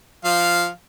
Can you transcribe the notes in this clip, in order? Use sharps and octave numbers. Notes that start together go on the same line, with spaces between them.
F3 F5